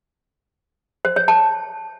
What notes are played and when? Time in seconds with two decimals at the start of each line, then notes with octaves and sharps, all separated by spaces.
1.05 C5
1.16 C#5
1.28 A5